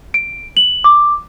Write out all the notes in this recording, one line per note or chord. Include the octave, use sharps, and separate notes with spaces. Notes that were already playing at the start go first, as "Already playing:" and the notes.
D7
F#7
D6